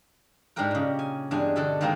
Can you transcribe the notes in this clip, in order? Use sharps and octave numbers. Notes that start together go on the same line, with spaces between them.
G#2 G#3 D4 G4 A#4 G5
A#2 C#3
G#5
E2 G2 G#3 D4 G#5
B2 D3 A4 D5 A5
D#3 G#3 A#3 C4 D#4